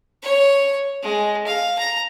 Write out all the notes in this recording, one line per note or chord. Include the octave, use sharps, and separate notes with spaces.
C#5
G#3
F5
A#5